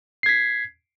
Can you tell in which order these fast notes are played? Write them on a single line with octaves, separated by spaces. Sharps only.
C7 G#6 B6